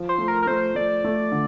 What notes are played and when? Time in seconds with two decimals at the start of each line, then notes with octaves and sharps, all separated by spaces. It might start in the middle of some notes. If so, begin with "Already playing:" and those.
Already playing: F3
0.09 C5
0.18 A3
0.28 A#4
0.43 A#4
0.47 A3 C5
0.75 A3 D5
1.04 A3
1.32 D3